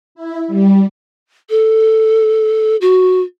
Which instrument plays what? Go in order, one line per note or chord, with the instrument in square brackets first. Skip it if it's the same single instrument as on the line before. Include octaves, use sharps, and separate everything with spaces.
[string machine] E4
G3
[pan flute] A4
F#4